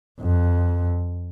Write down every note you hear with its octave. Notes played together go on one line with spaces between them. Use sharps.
F2